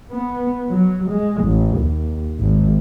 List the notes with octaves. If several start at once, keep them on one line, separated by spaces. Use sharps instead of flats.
B3
F#3
G#3
A1
D#2
G#1